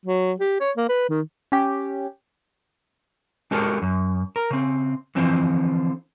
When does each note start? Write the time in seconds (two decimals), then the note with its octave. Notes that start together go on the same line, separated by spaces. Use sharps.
0.06 F#3
0.40 G4
0.60 C#5
0.77 A#3
0.89 B4
1.09 D#3
1.52 C#4 G4
3.51 G#3 D4 F#4 G4 A4 A#4
3.82 F#2
4.36 A#4
4.50 C#3 C4
5.15 D3 E3 F3 C4 C5